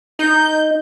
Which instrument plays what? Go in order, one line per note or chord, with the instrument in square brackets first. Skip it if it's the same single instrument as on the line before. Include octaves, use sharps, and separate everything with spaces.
[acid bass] D#4 [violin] G6